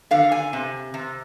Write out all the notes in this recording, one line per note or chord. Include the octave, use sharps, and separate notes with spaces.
D3 F5
G#5
C3
C3